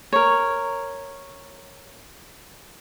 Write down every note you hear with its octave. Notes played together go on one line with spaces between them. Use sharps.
A#4 C#5